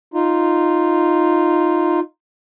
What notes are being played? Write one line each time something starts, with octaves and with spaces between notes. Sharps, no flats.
D#4 F4